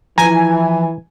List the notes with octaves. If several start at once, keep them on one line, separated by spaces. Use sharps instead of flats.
E3 F3 G#5 A#5